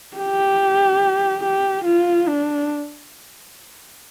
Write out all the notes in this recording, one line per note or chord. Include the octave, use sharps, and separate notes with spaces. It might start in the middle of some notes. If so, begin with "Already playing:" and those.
G4
G4
F4
D4